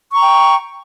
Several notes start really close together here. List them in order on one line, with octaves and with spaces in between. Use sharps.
C#6 A#5 G5